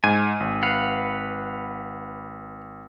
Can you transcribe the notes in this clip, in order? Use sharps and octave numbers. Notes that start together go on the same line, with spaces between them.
G#2 G#5
G#1
B4 F5 F#5